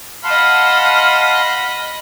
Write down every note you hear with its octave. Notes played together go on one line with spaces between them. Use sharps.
D#5 F5 F#5 A5 B5 C6